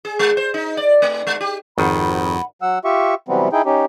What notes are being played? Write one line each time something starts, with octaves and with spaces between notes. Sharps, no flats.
G#4
G#3
C5
D#4
D5
A3
G#3
G4
G#1 F2 D#3 F#5 B5
F#3 F#5 E6
F4 G4 E5 C#6
C3 E3 F#3 G3 B3 C4
D#4 E4 G#4 G5
C#4 D#4 G4